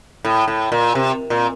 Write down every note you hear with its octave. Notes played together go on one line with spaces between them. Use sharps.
A2
A2
A#2
C3
A#2